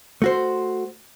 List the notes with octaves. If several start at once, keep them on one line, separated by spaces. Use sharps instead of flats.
A3 F#4 C5